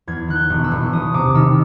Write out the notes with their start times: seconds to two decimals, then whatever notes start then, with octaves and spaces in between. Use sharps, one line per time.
0.07 E2 G#6
0.28 D#3 F#6
0.35 G6
0.50 E1
0.64 E6
0.72 E1
0.93 E1 D#6
1.14 C3 D6
1.35 D#3 E6